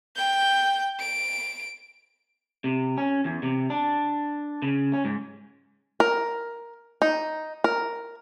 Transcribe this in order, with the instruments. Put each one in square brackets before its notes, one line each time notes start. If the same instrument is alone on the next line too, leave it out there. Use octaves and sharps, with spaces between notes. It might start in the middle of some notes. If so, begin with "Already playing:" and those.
[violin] G5 G6
D7
[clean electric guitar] C3
C#4
E2
C3
D4
C#3
C#4
G#2
[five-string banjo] A#4
D#4
A#4